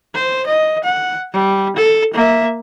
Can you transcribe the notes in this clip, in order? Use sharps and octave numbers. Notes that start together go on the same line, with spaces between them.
C5
D#5
F#5
G3
A4
A#3 E5